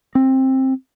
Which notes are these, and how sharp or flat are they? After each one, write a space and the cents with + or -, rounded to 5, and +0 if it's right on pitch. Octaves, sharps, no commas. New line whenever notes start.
C4 +15